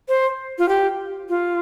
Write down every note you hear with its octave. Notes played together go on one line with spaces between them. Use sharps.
C5
F4
G4
F4